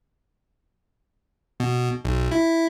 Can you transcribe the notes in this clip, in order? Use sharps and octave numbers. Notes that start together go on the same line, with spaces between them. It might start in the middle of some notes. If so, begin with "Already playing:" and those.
B2
B1
E4